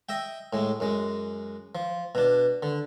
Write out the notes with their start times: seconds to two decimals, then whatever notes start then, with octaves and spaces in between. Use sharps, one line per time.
0.09 D#5 E5 G5
0.53 A2 G#3
0.80 F#2 G#3
1.75 F3
2.15 B2 D4
2.63 D3